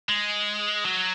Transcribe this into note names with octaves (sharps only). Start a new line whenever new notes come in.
G#3
F#3